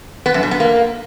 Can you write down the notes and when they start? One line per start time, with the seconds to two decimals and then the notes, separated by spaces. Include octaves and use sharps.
0.26 B3
0.34 F#2
0.43 B2
0.51 B3
0.60 A#3